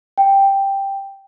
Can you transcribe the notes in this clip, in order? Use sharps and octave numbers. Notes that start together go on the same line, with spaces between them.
G5